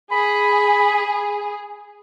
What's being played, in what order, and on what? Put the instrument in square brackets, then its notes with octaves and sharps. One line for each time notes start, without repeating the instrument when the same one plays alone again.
[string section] G#4 [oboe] B5